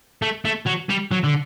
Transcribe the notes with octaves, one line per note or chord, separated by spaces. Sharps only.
A3
A3
F#3
G3
F#3
D3